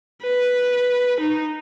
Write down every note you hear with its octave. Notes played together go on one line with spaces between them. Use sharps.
B4
D#4